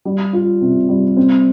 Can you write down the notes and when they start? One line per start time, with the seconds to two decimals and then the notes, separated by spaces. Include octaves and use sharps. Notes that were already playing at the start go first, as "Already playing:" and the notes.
0.05 G3
0.33 F4
0.61 C3
0.89 G3
1.17 C4